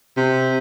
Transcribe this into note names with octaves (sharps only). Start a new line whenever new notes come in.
C3